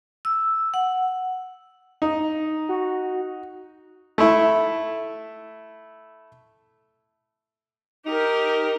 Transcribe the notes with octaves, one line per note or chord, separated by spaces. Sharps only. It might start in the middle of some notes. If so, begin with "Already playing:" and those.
E6
F#5
D#4
F#4
A3 E4
D#4 G4 A#4